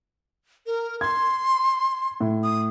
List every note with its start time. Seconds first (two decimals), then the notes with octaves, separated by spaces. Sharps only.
0.66 A#4
1.01 C6 G#6
2.20 A2
2.44 D#6